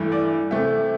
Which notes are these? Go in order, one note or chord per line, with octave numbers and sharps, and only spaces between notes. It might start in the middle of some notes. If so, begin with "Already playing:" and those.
Already playing: G2 E3 A3
D5
C3 A3 E5